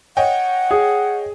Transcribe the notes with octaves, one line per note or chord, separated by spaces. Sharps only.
C#5 D#5 F#5 G5
G#4